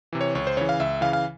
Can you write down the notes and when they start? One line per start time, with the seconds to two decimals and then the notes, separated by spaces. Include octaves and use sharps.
0.13 C3 E3
0.21 C#5
0.35 C#2 C#5
0.47 C5
0.57 C#3 E3 C#5
0.69 F5
0.80 C#2 E5
1.01 C#3 E3 F5
1.13 F5